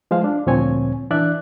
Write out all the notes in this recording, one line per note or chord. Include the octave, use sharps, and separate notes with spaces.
F3 G#3 C5 F5
D4
D2 A#2 F3 C4 C#5 G#5
E3 D4 D5 E5 F#6